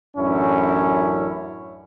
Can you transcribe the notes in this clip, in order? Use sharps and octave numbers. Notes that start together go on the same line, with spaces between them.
A1 F#2 C#4 D4 E4